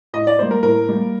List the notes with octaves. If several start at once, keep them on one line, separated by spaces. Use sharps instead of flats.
A2 D#5
D5
G3 A#3 C5
A#4
A2 A#4
G3 A#3